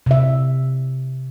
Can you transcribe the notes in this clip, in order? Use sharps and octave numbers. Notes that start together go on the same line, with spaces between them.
C3 E5